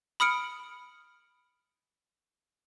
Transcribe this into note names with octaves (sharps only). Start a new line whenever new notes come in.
B5 D#6 F6 C#7 D7